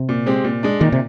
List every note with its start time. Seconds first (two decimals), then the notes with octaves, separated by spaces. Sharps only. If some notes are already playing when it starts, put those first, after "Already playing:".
Already playing: C3
0.09 A#2
0.26 G#3 C4 G4
0.44 A#2
0.63 G#3 D4
0.80 A#2 D#3
0.92 C3